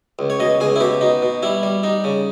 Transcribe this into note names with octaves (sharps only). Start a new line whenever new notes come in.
C#2
C#5
B2 D#5
C#2 G#4
E4
B2 G4
B2 D#4
B2
G3 E4
G3
G3 D#4
C#3